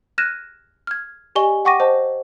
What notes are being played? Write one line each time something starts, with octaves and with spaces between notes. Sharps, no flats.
F6 F#6 G#6 A#6 D#7 E7
F6 G#6
G4 D5 D#5 G#5 C#6 G7
F#5 G5 C#6 D6 A#6 D#7
C5 D#5 A5